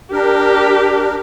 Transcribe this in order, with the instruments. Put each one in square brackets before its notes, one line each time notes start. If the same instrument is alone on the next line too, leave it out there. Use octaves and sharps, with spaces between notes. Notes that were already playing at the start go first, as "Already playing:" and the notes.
[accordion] D4 A#4 [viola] G4